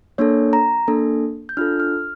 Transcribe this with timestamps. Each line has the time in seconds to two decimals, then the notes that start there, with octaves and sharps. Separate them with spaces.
0.18 A#3 D4 A4 C#5
0.53 A#5
0.88 A#3 D4 A4
1.49 G6
1.57 D4 F4 A4 F6
1.80 F6